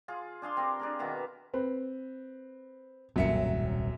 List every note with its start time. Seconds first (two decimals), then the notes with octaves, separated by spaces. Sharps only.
0.08 F4 G#4
0.42 D4 G#4 F5 C6
0.57 C4 G4 A#4
0.79 D4 G#4 A#4
0.99 B2 D#3 E5 F5
1.54 C4 B4
3.16 D#1 C2 F#2 A2 F#3 A#3 E5 C#7